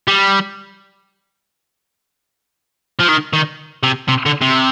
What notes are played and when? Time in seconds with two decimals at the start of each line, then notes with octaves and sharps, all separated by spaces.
0.08 G3
2.99 F3
3.08 D#3
3.33 D#3
3.83 C3
4.08 C3
4.26 D3
4.42 C3